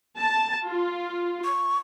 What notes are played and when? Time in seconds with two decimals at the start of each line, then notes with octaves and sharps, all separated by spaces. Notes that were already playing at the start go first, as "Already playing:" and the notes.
0.18 A5
0.67 F4
1.44 C#6